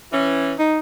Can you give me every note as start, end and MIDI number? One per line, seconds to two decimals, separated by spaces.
0.12 0.55 52
0.12 0.55 61
0.59 0.80 63